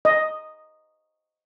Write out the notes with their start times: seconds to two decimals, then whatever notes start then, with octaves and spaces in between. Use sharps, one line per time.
0.05 D#5